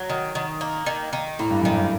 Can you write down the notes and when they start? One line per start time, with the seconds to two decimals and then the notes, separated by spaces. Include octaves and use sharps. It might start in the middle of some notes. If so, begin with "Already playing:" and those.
Already playing: F#3
0.09 D#3
0.35 D#3
0.61 A#3
0.86 D#3
1.13 D#3
1.39 A2 A#3
1.51 G2
1.62 F#2 D#3
1.73 G2